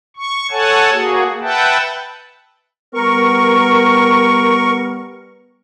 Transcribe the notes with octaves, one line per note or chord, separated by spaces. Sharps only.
C#6
A4 C#5 F#5 G#5 A5
A#3 F#4 G#4
B4 E5 F#5 G5 A5
G3 B3 A#4 C#6